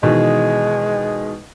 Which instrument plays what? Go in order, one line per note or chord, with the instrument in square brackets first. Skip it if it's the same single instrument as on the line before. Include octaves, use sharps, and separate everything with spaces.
[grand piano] B2 D#3 E3 [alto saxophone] G#3